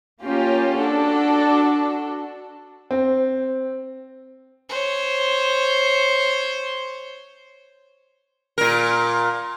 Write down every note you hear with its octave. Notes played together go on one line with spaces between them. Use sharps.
A#3 C#4 F4 G4
D4 F#4 A4
C4
C5 C#5
A#2 A#4